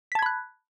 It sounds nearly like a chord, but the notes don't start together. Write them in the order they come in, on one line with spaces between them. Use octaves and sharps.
B6 A5 G#6 B5 F#6